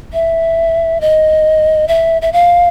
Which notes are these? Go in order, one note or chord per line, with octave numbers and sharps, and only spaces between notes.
E5
D#5
E5
E5
F5